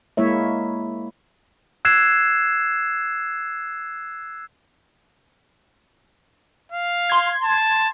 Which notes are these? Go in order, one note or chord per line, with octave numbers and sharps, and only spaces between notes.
G#3 A#3 E4 C#5 E5
E6 F#6 G#6 C7 E7
F5
C6 G#6
A5